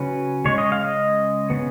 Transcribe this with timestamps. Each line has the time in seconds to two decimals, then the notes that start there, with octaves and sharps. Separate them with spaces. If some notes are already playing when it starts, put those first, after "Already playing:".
Already playing: C#3 F#3 C#4 B4
0.45 C#3 G#3 C#4 C#5
0.58 D#5
0.72 F5
0.85 D#5
1.50 C#3 F3 B3